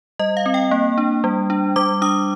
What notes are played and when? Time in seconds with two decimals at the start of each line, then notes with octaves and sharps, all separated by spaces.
0.19 G3 D#5
0.37 F5
0.46 C4
0.54 G5
0.71 A#3
0.98 D4
1.24 G3
1.50 D4
1.76 G3 D6
2.02 D4 D#6